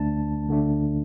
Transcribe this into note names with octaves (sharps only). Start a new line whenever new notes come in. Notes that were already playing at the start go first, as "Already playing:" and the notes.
Already playing: D2 D3 A3 D4 A5
D2 D3 A3 D4